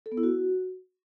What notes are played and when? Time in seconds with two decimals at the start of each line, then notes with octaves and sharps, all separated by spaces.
0.06 A4
0.12 B3
0.17 E4
0.23 F#4